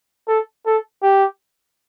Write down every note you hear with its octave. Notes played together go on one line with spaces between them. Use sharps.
A4
A4
G4